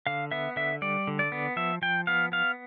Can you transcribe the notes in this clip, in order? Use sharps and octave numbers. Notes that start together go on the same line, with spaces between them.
D3 F5
B3 E5
D3 E5
G3 D5
D3
D5
B3
F3 E5
F3 G5
B3 F5
B3 F5